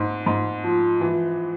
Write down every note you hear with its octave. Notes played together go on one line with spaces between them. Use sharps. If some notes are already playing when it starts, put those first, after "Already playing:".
Already playing: G#2
G#2
F3
E3